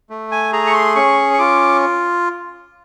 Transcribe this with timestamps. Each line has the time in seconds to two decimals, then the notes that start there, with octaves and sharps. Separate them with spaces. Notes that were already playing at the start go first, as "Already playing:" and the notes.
0.10 A3
0.32 G#5
0.53 G#4 A#5
0.67 C#6
0.74 C6
0.96 C#4 C#6
1.34 C#6
1.39 F4 D6